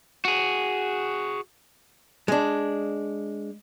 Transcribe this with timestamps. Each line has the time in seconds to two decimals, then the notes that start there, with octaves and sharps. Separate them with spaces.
0.25 F#4 G#4
2.28 G#3 D4